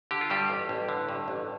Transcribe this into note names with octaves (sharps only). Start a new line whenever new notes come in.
D3 G4
F4
G2 G3 G4
A1
A1
D3
G2
A1